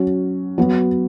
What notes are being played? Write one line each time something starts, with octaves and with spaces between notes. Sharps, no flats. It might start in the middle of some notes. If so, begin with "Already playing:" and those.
Already playing: F#3 C#4 F#4
F#3 B3 F#4